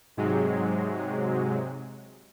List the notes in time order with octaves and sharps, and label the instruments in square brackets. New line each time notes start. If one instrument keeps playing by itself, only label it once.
[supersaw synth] G#2 C3 F#3 G#3